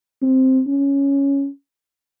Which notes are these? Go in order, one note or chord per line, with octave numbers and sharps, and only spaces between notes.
C4
C#4